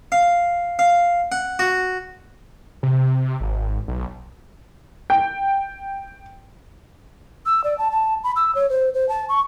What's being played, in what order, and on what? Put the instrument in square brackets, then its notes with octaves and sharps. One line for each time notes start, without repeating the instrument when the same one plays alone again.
[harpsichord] F5
F5
F#5
F#4
[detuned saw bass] C3
G#1
B1
[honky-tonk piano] G5
[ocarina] E6
D5
A5
A5
B5
E6
C#5
C5
C5
A5
C#6